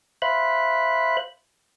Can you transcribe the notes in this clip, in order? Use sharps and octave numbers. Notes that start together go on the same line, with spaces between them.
C5 E5 F5 B5 F#6